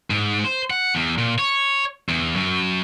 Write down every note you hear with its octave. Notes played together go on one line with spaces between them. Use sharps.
G#2
C5
F#5
E2
A#2
C#5
E2
F#2